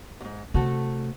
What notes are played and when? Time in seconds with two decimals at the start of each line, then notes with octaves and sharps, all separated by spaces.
0.21 E2 G#2
0.54 C3 A3 F#4 A4